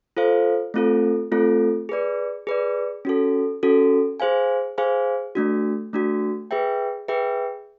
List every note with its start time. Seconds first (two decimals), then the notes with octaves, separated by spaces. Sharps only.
0.17 F4 A4 C5 F5
0.74 A3 C4 F4 A4
1.32 A3 C4 F4 A4
1.89 G#4 B4 D5
2.47 G#4 B4 D5
3.05 C#4 F#4 A4
3.63 C#4 F#4 A4
4.20 G#4 C5 F5 G#5
4.78 G#4 C5 F5 G#5
5.35 A3 D4 F#4
5.93 A3 D4 F#4
6.51 G#4 B4 E5 G5
7.08 G#4 B4 E5 G5